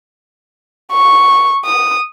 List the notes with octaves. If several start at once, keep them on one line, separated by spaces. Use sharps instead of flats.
C#6
D#6